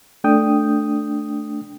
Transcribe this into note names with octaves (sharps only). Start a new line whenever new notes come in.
A3 D4 G5 D#6